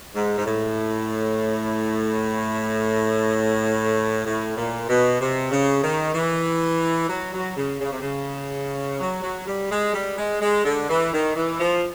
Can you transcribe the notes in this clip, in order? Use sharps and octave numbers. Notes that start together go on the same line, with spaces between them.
G#2
G#2
A2
A2
A#2
B2
C3
C#3
D#3
E3
F#3
F#3
C#3
C#3
C3
C#3
F#3
F#3
G3
G#3
G3
G#3
G#3
D3
E3
D#3
E3
F3